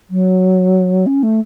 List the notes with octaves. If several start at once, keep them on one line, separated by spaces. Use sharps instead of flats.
F#3
C#4
A3